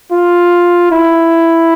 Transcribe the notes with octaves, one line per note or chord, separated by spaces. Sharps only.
F4
E4